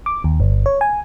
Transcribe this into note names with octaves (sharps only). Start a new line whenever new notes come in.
D6
D#2
G1
C#5
G#5